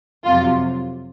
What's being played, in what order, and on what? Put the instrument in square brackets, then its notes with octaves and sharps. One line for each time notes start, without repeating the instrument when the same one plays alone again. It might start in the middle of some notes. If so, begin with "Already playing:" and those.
[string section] F2 C3 F#3 F4